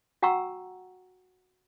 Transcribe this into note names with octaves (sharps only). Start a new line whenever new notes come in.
F#4 F#5 G5 A#5 C#6 E6